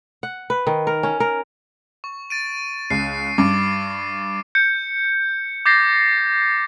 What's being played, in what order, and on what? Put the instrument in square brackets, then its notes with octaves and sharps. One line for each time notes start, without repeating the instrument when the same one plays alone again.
[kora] F#5
B4
D#3
A#4
C#4
A#4
[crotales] C#6
A6 D7 D#7
[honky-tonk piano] C#2 [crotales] C7
[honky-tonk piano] G2 [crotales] D6 D7
[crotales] G6 C#7
D6 G6 A6 A#6 C7